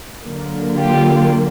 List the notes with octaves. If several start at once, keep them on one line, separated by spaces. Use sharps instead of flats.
D3 F#3 A#3
F4 G4